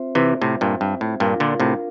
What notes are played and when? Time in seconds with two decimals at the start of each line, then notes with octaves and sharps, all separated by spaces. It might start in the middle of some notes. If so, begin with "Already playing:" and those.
Already playing: C4 F4 C5 E5
0.15 C3 E3
0.42 A2 C3
0.61 G2 A#2
0.81 G2
1.01 A2
1.20 G2 A#2 D4 F4 A#4 F5
1.40 A#2 D3
1.60 A2 C3